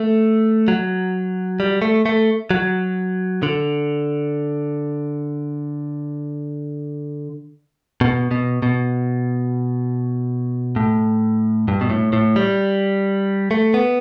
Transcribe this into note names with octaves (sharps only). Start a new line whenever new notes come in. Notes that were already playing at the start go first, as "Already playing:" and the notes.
Already playing: A3
F#3
G3
A3
A3
F#3
D3
B2
B2
B2
A2
G2
B2
A2
A2
G3
A3
B3